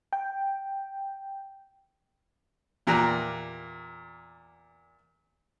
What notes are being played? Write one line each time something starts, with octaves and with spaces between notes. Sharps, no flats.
G5
E2 A#2 G4 A#5 F#6